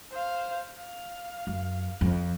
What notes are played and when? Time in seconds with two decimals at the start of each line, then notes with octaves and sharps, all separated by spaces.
0.12 C5 F5
0.76 F5
1.47 F#2
2.01 F2